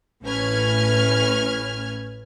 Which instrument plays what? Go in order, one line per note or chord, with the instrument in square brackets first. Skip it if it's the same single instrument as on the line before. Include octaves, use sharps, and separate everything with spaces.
[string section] A1 A2 C#4 B4 F6 G#6